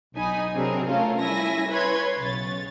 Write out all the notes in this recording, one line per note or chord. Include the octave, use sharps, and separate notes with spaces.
B1 D#4 G#5 B5
C3 F#3 C4 D4 G#4 A#4
A3 C#4 F4 A4 A#4
G3 C#4 E4 E5 G#5 A#6
B4 C#5 B5 C6 G#6
B1 C#3 C#5 A6